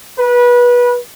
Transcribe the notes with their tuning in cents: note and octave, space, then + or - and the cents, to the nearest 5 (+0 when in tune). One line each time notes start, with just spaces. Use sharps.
B4 -25